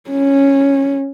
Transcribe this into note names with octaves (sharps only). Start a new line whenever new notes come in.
C#4